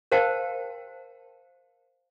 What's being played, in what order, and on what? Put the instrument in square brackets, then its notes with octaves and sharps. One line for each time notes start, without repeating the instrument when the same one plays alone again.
[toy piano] A#4 C5 F5 G5 A5